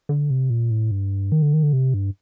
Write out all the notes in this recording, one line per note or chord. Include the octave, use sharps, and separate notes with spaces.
D3
C3
A#2
A2
G2
D#3
D3
D#3
D3
C3
G2